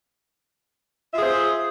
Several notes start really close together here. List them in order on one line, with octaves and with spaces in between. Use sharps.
E5 F4 G#4 C5